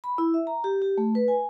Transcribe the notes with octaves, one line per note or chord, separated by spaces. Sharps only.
B5
E4
E5
A#5
G4
G4
A3
B4
G#5